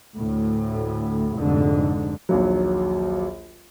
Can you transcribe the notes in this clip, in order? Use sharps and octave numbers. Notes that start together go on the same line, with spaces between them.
D2 A2
F1 G#2 D3
A#1 D#2 F#3